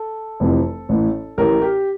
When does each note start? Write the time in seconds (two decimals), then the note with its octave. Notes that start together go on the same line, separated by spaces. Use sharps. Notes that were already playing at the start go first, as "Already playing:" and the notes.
Already playing: A4
0.40 F1 F2 C3 E3
0.89 A1 A2 E3
1.38 A1 A2 E3 G4 A#4
1.62 G4